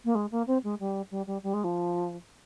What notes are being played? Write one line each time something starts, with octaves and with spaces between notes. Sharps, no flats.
A#3
G#3
A#3
C4
G#3
G3
G3
G3
G3
G#3
F3